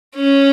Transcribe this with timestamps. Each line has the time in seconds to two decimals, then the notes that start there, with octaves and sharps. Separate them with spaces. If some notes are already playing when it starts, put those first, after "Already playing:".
0.16 C#4